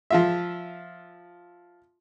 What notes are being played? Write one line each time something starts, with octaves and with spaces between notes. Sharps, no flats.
F3 F4 E5